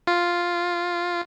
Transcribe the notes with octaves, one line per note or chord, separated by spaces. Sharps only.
F4